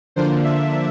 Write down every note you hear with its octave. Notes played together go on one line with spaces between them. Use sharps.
D3 F3 A#3 D4 F4 C5
E5